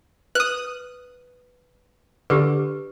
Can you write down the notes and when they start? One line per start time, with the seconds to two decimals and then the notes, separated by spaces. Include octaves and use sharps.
0.35 B4 D#6 F#6
2.30 D3 G4 B4